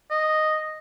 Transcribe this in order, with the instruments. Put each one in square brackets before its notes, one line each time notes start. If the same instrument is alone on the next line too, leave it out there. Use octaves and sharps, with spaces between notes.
[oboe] D#5